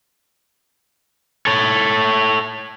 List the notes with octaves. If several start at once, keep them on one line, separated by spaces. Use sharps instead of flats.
A4 C#5